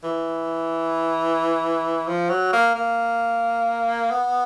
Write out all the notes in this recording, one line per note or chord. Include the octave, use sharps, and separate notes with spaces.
E3
F3
F#3
A#3
A#3
B3